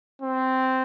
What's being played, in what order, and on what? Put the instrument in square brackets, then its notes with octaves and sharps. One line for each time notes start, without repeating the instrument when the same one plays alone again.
[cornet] C4